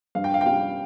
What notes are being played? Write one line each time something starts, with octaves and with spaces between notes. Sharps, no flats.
G2 F5
G5
F5
G5
G3 C#4 F5